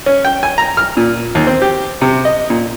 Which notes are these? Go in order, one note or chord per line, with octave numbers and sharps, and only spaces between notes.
C#4
G5
G#5
A#5
F6
A#2
D#2
C4
G4
C3
D#5
A#2